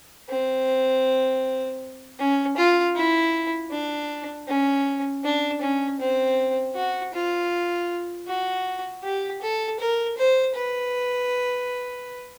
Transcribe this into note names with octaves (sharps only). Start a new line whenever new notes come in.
C4
C#4
F4
E4
D4
C#4
D4
C#4
C4
F#4
F4
F#4
G4
A4
A#4
C5
B4